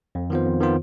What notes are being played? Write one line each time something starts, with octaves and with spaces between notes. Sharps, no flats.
F2
D#3 B3 F4 C5
F2
D#3 B3 F4 C5